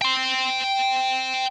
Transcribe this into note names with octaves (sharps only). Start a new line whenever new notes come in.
G5 C6